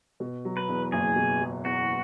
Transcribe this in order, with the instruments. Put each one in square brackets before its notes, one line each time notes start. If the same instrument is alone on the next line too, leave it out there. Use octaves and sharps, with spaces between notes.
[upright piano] B2
F#3
[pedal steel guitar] B4
[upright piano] E2
[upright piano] F#1 [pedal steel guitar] G#4
[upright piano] B2
F#3
[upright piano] E2 [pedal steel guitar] F#4